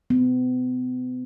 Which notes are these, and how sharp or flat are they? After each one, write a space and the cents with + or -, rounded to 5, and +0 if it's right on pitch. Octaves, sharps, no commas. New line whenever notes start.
B3 +40